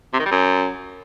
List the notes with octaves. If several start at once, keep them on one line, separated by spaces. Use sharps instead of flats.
C3
D#3
G3
F#2